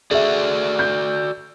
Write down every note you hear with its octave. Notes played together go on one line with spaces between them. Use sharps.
F#4 G#4 A4 D5 E5
G6